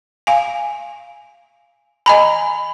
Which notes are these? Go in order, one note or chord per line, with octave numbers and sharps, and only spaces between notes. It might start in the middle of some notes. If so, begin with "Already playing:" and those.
F5 G#5
D#5 G#5 A#5 B5